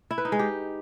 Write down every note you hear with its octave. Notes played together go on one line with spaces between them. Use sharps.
E4
B4
D#4
G#3
G4